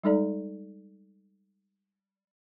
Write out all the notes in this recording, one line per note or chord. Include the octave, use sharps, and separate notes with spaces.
G3 G#3 D#4 A4 D5 A#5